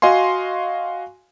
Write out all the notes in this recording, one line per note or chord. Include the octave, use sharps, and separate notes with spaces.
F#4 D#5 F5 G#5 C6